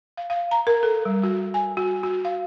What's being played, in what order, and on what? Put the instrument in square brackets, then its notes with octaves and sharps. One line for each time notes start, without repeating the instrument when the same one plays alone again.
[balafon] F5
F5
A#5
A#4
A4
G3
F#4
G#5
F#4
F#4
F5